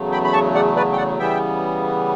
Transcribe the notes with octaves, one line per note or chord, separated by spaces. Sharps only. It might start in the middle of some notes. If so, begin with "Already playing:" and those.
Already playing: E2 C#3 F#3 A3
G5 B5
B5
A5 C#6
D5 F#5
B4 D5
G5
D5 F#5
C#3 E3 G3 B3 E5 G5